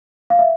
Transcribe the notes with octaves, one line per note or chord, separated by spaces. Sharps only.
F5
E5